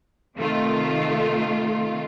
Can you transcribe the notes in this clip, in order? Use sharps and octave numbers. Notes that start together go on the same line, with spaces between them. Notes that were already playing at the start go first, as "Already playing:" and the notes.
C3 D#3 A3 F4